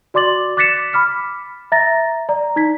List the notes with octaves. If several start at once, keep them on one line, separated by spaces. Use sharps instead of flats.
F#4 D5 C6 D6 A6 F#7
D6 F#6 A6 B6 C#7 E7
B5 D6 F6 B6
E5 A#5 A6 A#6
D5 A#5
D#4 G#6 B6